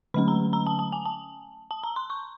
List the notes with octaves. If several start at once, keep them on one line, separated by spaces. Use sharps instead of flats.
D3 F#3 A3 C#4 B5
A#5
A#5
A5
A5
G#5
A5
A5
A#5
C6
C#6